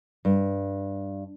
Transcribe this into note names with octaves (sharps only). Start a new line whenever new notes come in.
G2